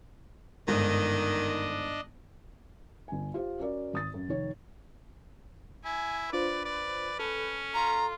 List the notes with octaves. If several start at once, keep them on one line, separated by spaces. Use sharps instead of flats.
G1 G#2 D#3 D4 D#5
G1 G#5
F4 G4 C5
C#4 F#4 A#4 D5
G#1 D#6 A6
F#2
F1 D#3 C#5
E4 G#5
D4 F4 B4 C5 D5
D5
C#4 A4
F4 A#5